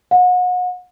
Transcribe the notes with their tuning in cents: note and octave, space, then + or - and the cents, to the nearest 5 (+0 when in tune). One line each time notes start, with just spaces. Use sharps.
F#5 -35